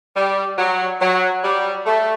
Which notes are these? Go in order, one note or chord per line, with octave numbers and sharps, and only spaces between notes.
G3
F#3
F#3
G3
A3